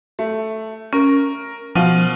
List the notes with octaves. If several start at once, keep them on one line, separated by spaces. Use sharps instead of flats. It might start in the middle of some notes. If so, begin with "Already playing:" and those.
A3
C#4 A#4
B2 F3 F4 D#7